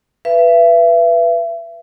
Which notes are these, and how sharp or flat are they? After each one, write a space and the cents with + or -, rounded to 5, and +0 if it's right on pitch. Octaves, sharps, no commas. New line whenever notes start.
B4 +0 E5 +35